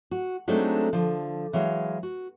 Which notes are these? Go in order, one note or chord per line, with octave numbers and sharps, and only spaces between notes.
F#4
F#3 G#3 A3 C4 D4 D#4
D3 F3
E3 F#3 G#3 F5
F#4